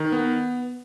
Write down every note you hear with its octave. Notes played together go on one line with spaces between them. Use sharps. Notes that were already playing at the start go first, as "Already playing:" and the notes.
Already playing: D#3
B3